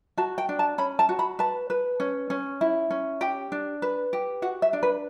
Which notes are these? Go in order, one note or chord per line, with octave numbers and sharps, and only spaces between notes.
F#4 A5
G5
D4
A5
C#4 B5
A5
F#4
B5
B4 A5
B4
C#4
C#4
E4
C#4
G4 G5
D4
B4
G4
F#4 F#5
E5
D4
B4